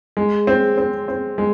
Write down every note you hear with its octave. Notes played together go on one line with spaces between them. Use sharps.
G#3
C4
C4
C4
G#3